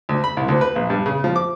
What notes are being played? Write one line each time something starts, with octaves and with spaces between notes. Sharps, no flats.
D2
B5
C2
D2
B4
A#1
G2
C#3
F3
D6